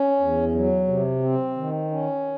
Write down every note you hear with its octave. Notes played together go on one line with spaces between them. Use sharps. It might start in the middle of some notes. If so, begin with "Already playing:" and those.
Already playing: C#4
E2
F#3
C3
C4
D#3
C#4